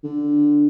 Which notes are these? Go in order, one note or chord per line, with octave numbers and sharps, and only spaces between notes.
D3